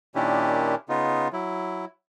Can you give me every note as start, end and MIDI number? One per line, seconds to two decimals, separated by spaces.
0.15 0.75 46
0.15 0.75 51
0.15 0.75 61
0.15 0.75 62
0.15 0.75 64
0.15 0.75 67
0.89 1.28 49
0.89 1.28 59
0.89 1.28 63
0.89 1.28 65
1.33 1.85 54
1.33 1.85 64